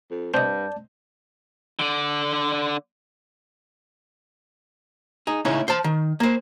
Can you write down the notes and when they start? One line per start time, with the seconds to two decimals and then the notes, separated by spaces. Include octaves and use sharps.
0.11 F2
0.34 G2 C4 D5 D#5 A5 G6
1.79 D3 D5
5.27 D#4 G#4
5.45 A2 C#3 C#4 D#4 E4
5.68 C5 A5
5.84 D#3
6.20 A#3 C5